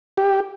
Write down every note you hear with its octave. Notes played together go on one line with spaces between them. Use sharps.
G4